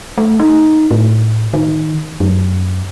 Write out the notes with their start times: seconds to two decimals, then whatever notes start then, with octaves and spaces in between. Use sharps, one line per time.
0.18 A3
0.39 D#4
0.91 A2
1.54 D#3
2.20 F#2